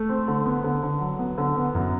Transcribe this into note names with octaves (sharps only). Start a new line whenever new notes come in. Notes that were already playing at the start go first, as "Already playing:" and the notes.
Already playing: A3
C4
D3
B3
D3
D3
F#3
B3
D3
B3
F#2